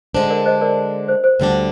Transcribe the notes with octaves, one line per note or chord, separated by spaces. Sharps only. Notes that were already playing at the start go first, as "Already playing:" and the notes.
D3 G#3 D4 C5
A#4 D5
C5 D#5
A#4 D5
C5
C5
D2 D3 G3 D4